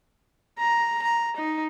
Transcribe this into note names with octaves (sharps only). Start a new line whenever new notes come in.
A#5
A#5
D#4